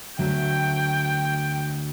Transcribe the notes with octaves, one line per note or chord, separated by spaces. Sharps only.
D2 D3 F#3 A3 G5